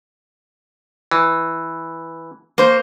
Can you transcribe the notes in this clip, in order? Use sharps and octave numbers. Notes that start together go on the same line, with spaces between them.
E3
A#3 C5